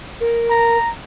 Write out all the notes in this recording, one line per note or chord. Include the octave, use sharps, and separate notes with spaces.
A#4
A#5